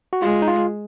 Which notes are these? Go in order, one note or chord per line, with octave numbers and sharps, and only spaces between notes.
F#4
G#3 F4
D#4
F4